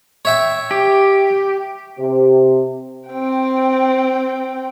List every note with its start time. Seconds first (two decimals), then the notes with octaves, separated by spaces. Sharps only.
0.25 C#5 E5 G5
0.71 G4
1.99 C3
3.09 C4 G5